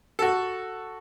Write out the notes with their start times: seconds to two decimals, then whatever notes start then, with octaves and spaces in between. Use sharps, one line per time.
0.19 F#4 A4